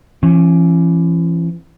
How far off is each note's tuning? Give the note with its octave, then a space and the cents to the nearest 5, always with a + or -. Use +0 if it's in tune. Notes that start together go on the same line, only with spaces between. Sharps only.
E3 +35 C#4 -30